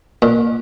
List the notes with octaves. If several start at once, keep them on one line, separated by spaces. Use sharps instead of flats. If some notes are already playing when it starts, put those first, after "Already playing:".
A#2 A#3